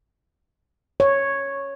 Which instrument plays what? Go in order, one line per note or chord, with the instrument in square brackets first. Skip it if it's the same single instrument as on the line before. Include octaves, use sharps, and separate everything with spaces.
[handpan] C#5